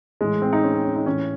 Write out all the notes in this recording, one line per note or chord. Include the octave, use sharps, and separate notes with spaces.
A2 E3 G#3
C4
D#4
C#4
C4
C#4
D#4
A2 E3 C#4